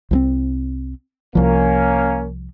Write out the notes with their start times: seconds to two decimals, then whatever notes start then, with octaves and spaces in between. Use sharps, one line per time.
0.11 C2 F3 C4
1.35 C2 F3 A#3 C#4